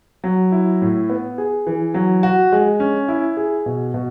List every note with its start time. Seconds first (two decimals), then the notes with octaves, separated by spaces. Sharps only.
0.24 F#3
0.52 E4
0.82 A2
1.10 B3
1.38 G#4
1.67 E3
1.94 F#3
2.23 F#4
2.52 G#3
2.80 C#4
3.08 E4
3.37 G#4
3.66 B2
3.94 B2